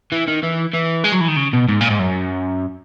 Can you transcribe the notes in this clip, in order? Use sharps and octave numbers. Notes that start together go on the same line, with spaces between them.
E3
D#3
E3
E3
G#3
F#3
E3
D#3
C#3
B2
G#2
A#2
G#2
F#2